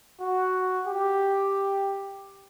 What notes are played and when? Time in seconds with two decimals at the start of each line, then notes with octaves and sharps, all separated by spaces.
0.21 F#4
0.87 G4